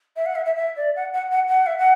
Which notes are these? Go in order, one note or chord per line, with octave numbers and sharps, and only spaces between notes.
E5
F#5
E5
E5
E5
D5
F#5
F#5
F#5
F#5
E5
F#5